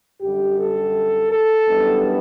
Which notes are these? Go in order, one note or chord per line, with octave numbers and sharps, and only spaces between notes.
F#2 D3 G3 G4
A4
A4
F#2 E3 G3 B3 D4